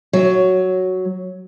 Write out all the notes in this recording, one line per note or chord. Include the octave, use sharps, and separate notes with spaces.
F#3